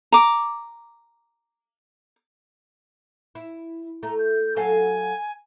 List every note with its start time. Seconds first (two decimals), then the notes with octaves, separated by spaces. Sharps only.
0.12 A#5 D6
3.35 E4
4.03 A3 A#5
4.18 G6
4.56 F#3 A4 F5 G#5